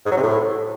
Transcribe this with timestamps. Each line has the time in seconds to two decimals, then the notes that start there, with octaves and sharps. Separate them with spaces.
0.06 G#2
0.11 F#3
0.17 C3
0.23 A2